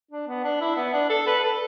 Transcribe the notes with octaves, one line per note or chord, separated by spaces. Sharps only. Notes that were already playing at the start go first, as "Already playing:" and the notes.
D4
B3
D4
E4
B3
D4
A4
B4
A4